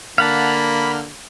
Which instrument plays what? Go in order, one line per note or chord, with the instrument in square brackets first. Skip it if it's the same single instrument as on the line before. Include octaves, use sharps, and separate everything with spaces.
[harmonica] D3 A#3 [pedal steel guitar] F5 F#5 A5 [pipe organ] B5